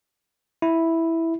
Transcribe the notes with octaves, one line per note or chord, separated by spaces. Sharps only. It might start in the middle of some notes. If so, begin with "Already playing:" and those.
E4